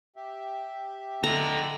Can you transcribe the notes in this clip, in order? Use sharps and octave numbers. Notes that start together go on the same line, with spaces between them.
G4 E5
D3 A4 D#5 A#5